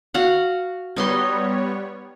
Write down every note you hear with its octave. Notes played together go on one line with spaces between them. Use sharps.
F#4 F5 F#5
G3 B3 D#4 C#5 D#5 C6